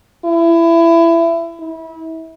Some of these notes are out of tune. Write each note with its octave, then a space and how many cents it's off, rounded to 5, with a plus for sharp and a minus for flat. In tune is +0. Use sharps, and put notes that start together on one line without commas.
E4 +25
E4 -30